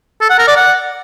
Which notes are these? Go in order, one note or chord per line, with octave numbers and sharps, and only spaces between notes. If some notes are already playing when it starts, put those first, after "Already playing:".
A4
F#5
A#4
D5
F#5